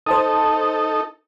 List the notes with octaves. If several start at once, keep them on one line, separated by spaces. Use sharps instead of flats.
D#4 A4 C5 A5 D#6